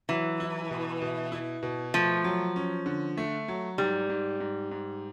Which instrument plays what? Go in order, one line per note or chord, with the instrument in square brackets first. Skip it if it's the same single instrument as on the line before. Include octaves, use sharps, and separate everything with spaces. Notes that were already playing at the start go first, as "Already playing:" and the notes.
[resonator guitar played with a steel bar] E3 [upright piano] F#3
[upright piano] E4
B2
B2
E4
B2
[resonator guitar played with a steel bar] F3 [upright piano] A3
[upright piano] F#3
C#4
D3
A3
F#3
[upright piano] G#2 [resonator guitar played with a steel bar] G3
[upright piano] G#2
G#2
G#2